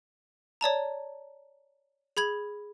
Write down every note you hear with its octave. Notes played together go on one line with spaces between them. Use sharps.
C#5 D5 A5 A#5
G#4 B5 G#6 F#7